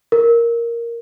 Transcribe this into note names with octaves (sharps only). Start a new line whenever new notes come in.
A#4